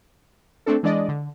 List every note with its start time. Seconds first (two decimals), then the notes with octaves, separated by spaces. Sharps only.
0.66 A3 C4 D4 A4
0.83 E3 G#3 D4 D5 D#5
1.08 D3